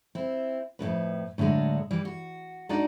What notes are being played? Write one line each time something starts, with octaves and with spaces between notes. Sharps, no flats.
C4 E4
F2 A2 C3 B4
A2 D3 F#3 G#3 D4
E3 G3
F#4
G#3 D4 D#4 F#4 D5 D#5